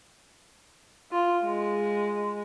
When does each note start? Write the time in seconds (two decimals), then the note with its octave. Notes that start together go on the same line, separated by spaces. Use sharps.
1.12 F4
1.44 G#3